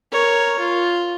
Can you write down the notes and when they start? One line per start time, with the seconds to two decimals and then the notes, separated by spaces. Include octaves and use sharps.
0.12 A#4 C#5
0.60 F4